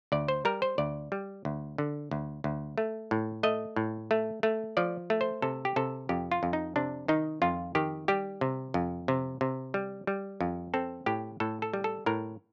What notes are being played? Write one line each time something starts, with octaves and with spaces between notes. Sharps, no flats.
D2 D5
C5
G3 A#4
C5
D2 D5
G3
D2
D3
D2
D2
A3
A2
A3 D#5
A2
A3
A3
F3 D5
A3
C5
C3 A4
G4
C3 A4
F2 G4
F4
F2
D#4
C3 D4
D#3 D#4
F2 F4
D#3 G4
G3 G4
C3
F2
C3
C3
G3
G3
F2
C4 A4
A2 G4
A2 A4
A4
G3
A4
A2 A#4